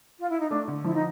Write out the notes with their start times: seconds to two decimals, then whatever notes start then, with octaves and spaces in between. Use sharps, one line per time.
0.19 F4
0.29 E4
0.40 D#4
0.49 A3 D4
0.68 D3
0.84 F3 E4
0.94 D#4